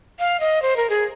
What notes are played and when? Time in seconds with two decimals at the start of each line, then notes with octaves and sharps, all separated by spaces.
0.20 F5
0.40 D#5
0.62 C5
0.77 A#4
0.90 G#4